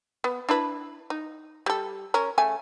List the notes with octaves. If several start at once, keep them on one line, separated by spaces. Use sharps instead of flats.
B3
D4 E4 B4
D#4
G3 A4
C#4 A#4
C#3 A3 G#5